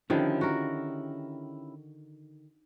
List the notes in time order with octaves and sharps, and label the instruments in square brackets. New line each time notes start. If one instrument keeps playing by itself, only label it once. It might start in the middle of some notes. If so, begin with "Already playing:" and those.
[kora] D3 D#3 F3 [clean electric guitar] C#4 E4 G4
[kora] F#4 A#4